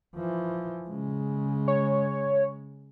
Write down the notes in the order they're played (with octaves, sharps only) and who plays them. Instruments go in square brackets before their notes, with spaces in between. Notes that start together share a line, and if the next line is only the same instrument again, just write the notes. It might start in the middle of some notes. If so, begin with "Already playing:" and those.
[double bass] E3 F3
C#3 G#3
[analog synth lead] C#5